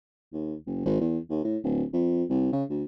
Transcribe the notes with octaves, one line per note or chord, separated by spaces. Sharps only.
D#2
F#1
G#1
E2
D#2
A2
D1
F2
C2
C#3
D2